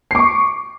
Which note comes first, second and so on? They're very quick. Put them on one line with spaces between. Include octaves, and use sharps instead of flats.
C7 D6 C#6